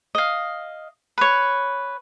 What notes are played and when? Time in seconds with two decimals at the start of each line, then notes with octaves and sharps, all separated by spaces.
0.15 D#5 F5
1.18 B4 C#5